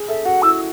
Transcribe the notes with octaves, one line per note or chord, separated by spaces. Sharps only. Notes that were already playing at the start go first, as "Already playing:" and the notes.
Already playing: G#4
A4 E5
F#4 F#5
E4 E6